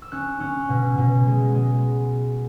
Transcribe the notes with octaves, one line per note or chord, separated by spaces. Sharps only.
E6
C#4 F#6
C#4
B2
B2
G#3
G#3